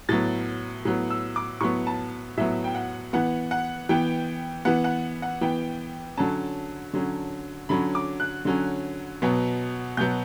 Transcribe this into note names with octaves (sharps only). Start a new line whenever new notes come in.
A2 F#3 B3 A6
A2 F#3 B3
E6
D6
A2 F#3 B3 C#6
A5
A2 F#3 B3 E5
G5
F#5
E3 B3 F#5
F#5
E3 B3 G5
E3 B3 F#5
F#5
F#5
E3 B3 G5
D3 F#3 C#4 A5
D3 F#3 C#4
D3 F#3 C#4 B5
D6
F#6
D3 F#3 C#4
B2 F#3 B3
B2 F#3 B3 G6